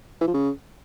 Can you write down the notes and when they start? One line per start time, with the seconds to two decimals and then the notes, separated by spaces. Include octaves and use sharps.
0.21 E3
0.27 F3
0.34 C#3